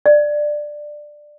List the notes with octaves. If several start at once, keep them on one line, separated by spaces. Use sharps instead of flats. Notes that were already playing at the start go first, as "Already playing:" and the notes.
D5